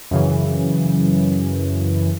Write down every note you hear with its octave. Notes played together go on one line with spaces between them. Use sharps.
F#2 C#3 E3